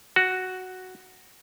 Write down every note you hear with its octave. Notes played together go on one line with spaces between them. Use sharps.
F#4